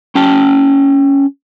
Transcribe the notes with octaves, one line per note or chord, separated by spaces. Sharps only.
C#4 G5 A5